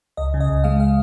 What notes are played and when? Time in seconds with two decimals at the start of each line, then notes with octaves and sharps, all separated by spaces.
0.17 C#2 D#5
0.34 C#3
0.40 D#5
0.49 C#2
0.64 G#3 F5
0.80 F5